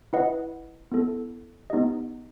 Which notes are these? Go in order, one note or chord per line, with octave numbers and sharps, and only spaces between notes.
E4 B4 D#5 F#5
B3 E4 A4
B3 D#4 G4 D#5